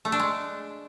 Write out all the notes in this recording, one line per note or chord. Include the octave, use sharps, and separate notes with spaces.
A3
D4
G#3